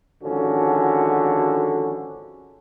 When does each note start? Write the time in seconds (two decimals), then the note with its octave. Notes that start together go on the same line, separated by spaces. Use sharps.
0.24 G#1 D3 F3 C#4 F#4